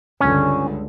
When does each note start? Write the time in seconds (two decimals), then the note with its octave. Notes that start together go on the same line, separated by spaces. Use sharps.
0.21 C#2 G2 D3 C#4